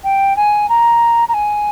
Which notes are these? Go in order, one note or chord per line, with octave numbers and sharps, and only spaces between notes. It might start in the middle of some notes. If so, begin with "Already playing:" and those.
G5
G#5
A#5
A#5
G#5